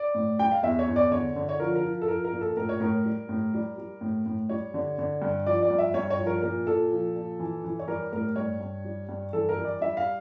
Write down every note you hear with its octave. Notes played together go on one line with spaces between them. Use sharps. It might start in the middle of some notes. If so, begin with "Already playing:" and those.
Already playing: D5
A2
G3 G5
F5
E2 E5
C#5
E2
D5
D3 C#5
D3
C#5
F3 A#4
A#4
F3
A4
F3 A#4
A#4
A#2
A4
A2 A#4
C#5
A2 A#4
G3
A2
G3
G3
A2
A2
G3 C#5
D3
D3
G2
F3 D5
D5
G2
E5
G2 C#5
C#5
F3
A#4
A#2 A#4
A#2 A4
F3
A#2
E3
E3
C#5
G3 A#4
A2 A#4
G2 C#5
G2
G3
G2
E3 A4
A#4
G3
D5
G3 E5
F5